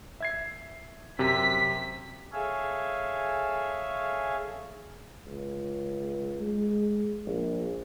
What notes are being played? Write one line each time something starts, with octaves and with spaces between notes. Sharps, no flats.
E5 G#6 C7
F#2 C3 B6
G#4 A4 C#5 E5 F5 G#5
C#2
G#3
A#1